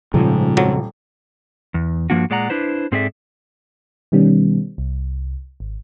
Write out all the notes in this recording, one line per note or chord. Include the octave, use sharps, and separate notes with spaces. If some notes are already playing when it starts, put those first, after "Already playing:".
D#1 G#2 C#3 F3
F2 F#3
E2
G2 F3 A#3 D4 F#4
A#2 G#3 D5 F#5 A#5
D4 E4 B4 C5
G#2 C4 G#4 A4 D5 E5
B2 D#3 G3 B3 C#4
C2
G#1